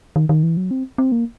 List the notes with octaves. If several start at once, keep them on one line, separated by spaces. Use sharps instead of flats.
D#3
D#3
E3
F#3
C4
C4
A#3